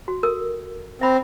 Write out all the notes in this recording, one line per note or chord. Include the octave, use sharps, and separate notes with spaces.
F#4
A4 A#4 E6
C4 E5 B5